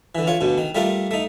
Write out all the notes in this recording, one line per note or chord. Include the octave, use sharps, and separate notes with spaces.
D3 E3
F4 C#5
D2 B2
D#3
G3 A3 F4 A#4
A3 D#4